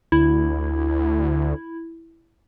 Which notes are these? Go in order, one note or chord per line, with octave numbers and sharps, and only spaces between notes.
D2 E4